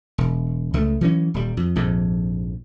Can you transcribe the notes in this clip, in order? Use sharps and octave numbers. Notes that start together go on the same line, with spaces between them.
E1
C#2 A3
E3 F#3 C#4
D#1 G3
F2
A#1 F2 G#2